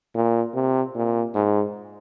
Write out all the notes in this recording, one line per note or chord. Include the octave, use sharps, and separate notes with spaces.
A#2
C3
A#2
G#2